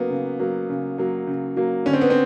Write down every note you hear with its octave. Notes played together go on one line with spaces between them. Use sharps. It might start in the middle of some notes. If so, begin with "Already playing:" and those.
Already playing: C#3 F#3 A#3 B3
C#3
F#3 A#3
C#3
F#3 A#3
C#3
F#3 A#3
D3 C#4
C4
B3
C4